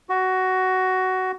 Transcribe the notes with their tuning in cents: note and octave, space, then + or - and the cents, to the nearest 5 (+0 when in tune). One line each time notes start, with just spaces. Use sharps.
F#4 +15